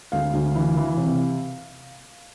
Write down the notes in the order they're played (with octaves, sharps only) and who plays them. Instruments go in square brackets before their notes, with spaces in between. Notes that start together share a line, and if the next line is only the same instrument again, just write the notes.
[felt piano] D2 F5
D2
E3
E3
C3